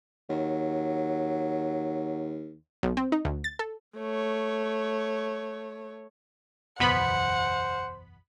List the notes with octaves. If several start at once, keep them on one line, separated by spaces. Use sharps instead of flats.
D#2 F#3
B1
C4
D#4
D2
A6
A4
A3 C#5
F#1 B1 E2 B2 B3 C5 F#5 B5